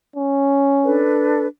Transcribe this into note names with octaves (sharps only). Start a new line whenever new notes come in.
C#4
D4 A4 B4